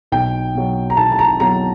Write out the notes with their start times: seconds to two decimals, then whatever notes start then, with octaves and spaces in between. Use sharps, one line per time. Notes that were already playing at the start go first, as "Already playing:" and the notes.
0.12 B1 G5
0.55 B2 F#3
0.90 A#5
0.97 B1 A5
1.12 A5
1.19 A#5
1.40 B2 F#3 A#5